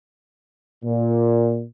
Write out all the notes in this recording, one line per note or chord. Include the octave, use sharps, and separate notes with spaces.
A#2